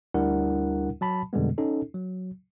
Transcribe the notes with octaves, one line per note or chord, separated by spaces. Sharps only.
D2 G3 D4 E4 A#4 F#5
F#3 A5 B5
F2 B2 D3 G3 G#3 B3
C#4 D#4 A4
F#3